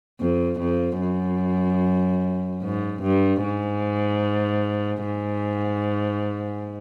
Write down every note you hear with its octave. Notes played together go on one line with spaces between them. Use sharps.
F2
F2
F#2
G#2
G2
G#2
G#2